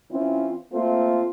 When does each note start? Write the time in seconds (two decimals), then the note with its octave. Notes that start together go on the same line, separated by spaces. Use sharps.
0.11 E3 C4 C#4 E4 F4
0.73 A3 A#3 C4 F4